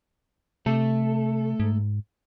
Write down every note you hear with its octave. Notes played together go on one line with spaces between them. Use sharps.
C3 A3 A4
G#2